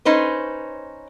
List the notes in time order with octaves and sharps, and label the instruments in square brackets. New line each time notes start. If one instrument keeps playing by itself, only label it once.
[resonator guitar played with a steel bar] C#4 D#4 B4 C5